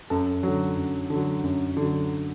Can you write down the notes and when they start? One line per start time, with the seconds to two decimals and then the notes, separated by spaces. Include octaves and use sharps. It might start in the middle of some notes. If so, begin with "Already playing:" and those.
0.10 F#2 A4
0.43 D3 F#3
0.77 F#2
1.10 D3 F#3
1.43 F#2
1.77 D3 F#3